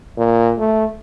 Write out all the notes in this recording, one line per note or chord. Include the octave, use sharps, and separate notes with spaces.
A#2
A3